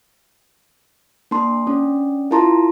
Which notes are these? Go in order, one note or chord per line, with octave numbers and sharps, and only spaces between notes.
A#3 D4 A5 C6
C#4 D4
E4 F4 A#4 A5 A#5 C6